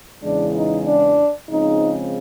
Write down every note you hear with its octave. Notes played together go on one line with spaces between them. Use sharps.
E2 C#3 E3 G#3 D4
D#4
D4
C#3 F3 G#3 C4 D#4